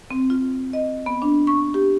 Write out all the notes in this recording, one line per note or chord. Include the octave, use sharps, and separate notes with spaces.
C4
F4
D#5
B3
D4
C#6
G4